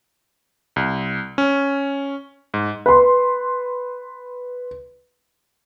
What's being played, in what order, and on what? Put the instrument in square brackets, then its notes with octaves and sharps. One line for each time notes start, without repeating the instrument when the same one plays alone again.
[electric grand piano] C2
C#4
G#2
[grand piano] B4 C6